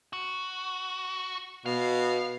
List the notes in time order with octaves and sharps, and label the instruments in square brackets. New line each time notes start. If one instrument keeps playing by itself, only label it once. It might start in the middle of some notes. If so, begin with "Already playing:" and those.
[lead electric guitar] F#4
[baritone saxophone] B2 [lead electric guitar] F5